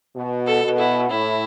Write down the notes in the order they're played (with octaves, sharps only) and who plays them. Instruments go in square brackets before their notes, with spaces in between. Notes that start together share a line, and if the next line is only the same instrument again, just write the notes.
[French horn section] B2
[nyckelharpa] A4
[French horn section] B2
[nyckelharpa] E4
[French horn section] A2 [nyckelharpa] E4